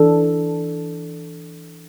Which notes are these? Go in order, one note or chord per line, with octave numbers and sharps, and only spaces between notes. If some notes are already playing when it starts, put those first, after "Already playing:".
Already playing: E3 D4 A4